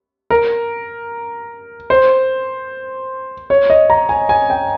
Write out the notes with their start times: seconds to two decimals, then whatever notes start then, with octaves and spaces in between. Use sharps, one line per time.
0.30 A#4
1.90 C5
3.50 C#5
3.70 D#5
3.90 A#5
4.09 G#5
4.29 G#5
4.50 G5